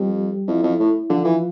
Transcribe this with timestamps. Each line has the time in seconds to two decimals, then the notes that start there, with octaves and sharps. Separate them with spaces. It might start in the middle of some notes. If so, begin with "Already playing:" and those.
Already playing: F2 G3 G4
0.48 F2 E4
0.63 F2
0.80 A2
1.10 D3 F3 F4
1.25 E3